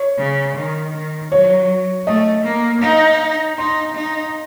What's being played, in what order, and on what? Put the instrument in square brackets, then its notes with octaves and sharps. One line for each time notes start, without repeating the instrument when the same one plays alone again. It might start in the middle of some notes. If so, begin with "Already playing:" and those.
Already playing: [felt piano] C#5
[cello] C#3
D#3
D#3
[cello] F#3 [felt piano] C#5
[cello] A3 [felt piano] D#5
[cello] A#3
[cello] D#4 [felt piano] F5
[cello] D#4 [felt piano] C6
[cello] D#4